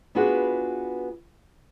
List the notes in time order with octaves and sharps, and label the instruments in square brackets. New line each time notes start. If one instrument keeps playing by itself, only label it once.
[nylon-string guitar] B3 D4 F4 F#4 G#4 B4